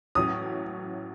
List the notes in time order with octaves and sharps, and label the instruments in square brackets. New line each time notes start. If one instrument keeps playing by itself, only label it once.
[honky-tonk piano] A1 A2 F#3 C#4 [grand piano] D#6